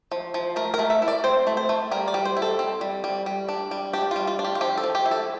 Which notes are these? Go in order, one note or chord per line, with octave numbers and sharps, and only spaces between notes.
F3
F3
A3 A#4
A#4
A3
E5
E4
D5
C4 C5
A3
C5
A3
G3 A#4
D5
G3
C5
E4
A4
C4
G3
G3
G3
D4
G3
D4 G4
G3 F4
F4
D4
G4
F4
F3 G4
A4
F3
G4
E4
A4